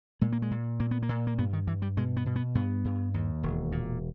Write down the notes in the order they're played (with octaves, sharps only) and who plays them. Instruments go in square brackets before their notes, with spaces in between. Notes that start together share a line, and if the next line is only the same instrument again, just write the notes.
[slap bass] A#2 G#3
A#3
G#3
A#2
A#2 A#3
B3
A#3
A#2
A#3
G2 B3
D#3
G2 E3
G3
B2 G#3
B3
B2
B3
G2 B3
G2
D#2
E1
A#2